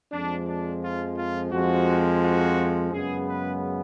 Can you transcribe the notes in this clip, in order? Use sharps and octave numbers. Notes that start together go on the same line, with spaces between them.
F2 F3 G#3 D4
D4
F4
F4
F2 F3 G#3 F#4
F#4
F#2 C#3 G#3 B3 G#4
B4